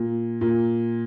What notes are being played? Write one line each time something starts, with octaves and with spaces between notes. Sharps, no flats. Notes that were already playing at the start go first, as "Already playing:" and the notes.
Already playing: A#2
A#2